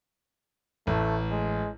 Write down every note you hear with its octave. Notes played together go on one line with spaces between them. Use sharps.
A1 A3
G#3